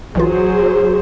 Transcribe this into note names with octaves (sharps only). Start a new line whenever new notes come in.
B1 E3 F#3 F4 G#4 C5